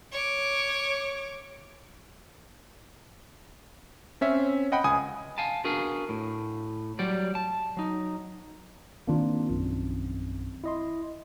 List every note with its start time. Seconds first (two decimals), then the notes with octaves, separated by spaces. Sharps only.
0.12 C#5 D6
4.21 C4 C#4 E5
4.72 D#5 F#5 G5 B5
4.84 C#2 G#5 D#6
5.38 F5 G#5 A5
5.64 B3 D4 F#4 G#4 A#4 F5
6.09 A2
6.99 F#3 G3 D5
7.35 A5
7.77 F#3 D#4
9.07 D#3 A#3 C4 D4 F4
9.50 A#1 F#2
10.64 E4 D#5 C6